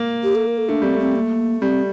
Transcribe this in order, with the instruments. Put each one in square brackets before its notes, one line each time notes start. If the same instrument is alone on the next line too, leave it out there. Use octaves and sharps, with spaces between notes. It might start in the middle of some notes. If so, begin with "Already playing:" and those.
Already playing: [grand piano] A#3
[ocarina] G4
A4
A#4
A4
[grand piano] A3 [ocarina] D4
[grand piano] G3 [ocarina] C4
[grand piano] A3
[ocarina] C4
A#3
[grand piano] G3 [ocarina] C4